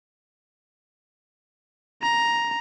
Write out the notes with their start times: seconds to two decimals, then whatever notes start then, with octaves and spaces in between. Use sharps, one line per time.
2.02 A#5